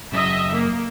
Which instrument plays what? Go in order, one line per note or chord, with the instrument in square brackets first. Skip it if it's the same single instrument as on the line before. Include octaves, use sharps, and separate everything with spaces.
[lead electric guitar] F#2 C#3 [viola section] D#5 E5
[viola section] A#3